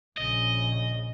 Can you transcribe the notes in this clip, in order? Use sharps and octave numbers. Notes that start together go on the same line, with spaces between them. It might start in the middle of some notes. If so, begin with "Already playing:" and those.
A#1 C#3 D#5